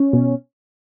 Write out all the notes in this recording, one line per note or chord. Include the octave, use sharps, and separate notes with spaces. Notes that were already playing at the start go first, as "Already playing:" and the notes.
Already playing: C#4
B2